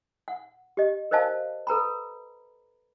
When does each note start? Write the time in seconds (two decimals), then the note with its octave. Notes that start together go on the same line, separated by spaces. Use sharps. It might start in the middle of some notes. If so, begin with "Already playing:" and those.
0.28 F#5
0.77 G4 D#5
1.11 A#4 C5 D#5 F5 A5
1.67 A4 B4 A#5 B5